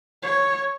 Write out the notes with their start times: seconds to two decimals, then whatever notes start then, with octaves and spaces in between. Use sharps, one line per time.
0.23 C#5